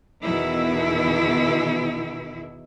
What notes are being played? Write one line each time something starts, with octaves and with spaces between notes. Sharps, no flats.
E2 B2 D#3 E3 E4